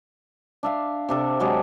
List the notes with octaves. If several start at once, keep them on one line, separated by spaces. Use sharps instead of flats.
D4 E5 F5
C3 D4 A4
D3 F#3 G#3 G4